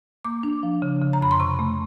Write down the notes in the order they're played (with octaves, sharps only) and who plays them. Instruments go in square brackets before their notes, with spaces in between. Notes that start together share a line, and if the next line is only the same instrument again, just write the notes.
[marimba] A#3 D6
D4
F3
C#3
C#3
A#5
F2 B5
C6
C3 C#6
A3